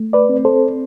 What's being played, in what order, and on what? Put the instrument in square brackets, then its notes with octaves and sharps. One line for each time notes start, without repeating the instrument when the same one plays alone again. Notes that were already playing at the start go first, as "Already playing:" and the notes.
Already playing: [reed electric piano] A3
B4 D5
C4
A4 C5